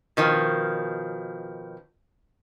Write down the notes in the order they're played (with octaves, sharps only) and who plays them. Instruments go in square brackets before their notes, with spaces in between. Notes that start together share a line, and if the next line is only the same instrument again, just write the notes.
[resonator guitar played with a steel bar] B2 D#3 F3